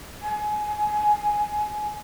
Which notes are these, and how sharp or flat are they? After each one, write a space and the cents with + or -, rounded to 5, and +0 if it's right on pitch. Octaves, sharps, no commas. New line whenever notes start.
G#5 +20